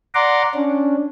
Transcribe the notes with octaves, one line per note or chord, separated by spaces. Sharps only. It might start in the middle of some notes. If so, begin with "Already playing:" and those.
D5 F#5 A#5 C6 D6
C#4 D4